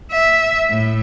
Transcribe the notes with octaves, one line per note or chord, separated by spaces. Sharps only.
E5
A2